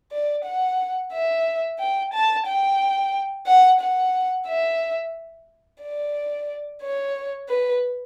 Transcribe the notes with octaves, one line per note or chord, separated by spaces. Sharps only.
D5
F#5
E5
G5
A5
G5
F#5
F#5
E5
D5
C#5
B4